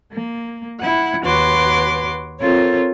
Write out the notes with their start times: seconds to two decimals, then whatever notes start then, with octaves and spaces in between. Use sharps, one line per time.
0.11 A#3
0.79 E4 F#5
1.24 D#2 F#4 B4 C#5 C6 D6
2.39 C4 F4 A4 A#4 C#5